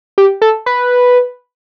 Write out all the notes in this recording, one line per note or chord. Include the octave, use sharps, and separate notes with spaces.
G4
A4
B4